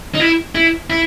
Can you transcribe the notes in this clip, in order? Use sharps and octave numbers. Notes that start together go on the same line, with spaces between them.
D#4
E4
E4
E4